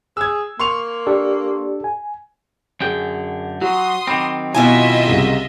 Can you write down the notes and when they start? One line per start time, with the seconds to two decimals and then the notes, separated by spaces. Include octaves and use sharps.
0.17 G#4 E6 G#6
0.60 A#3 C6 C#6 F7
1.07 D4 G4 A4 D5
1.84 G#5
2.81 F#2 D3 G#4 G5
3.61 F#3 F#4 C6 D#6
4.07 D#3 F#3 C4 B5 D6
4.54 B2 E4 F4 D#5 E5 G#5
5.05 C2 C#3 A#6